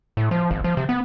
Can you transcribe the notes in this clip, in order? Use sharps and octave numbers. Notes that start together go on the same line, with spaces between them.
A2
F3
G#1
F3
C3
B3